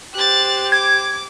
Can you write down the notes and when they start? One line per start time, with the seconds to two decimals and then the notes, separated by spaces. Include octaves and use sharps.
0.14 G4 C5 F#6 A6
0.72 D6 G#6